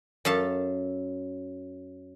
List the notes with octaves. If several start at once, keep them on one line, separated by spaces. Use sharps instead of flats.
F#2 A4 F5 A5